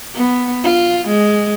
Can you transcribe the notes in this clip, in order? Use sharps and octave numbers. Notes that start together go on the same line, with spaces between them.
B3
F4
G#3